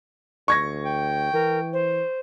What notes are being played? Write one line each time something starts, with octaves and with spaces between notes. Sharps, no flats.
D2 C#6 G#6 A#6
G5
E3 A#4
C5